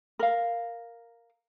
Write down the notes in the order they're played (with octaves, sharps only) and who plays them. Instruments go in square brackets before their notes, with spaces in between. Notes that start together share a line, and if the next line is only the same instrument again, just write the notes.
[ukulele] A#4 F5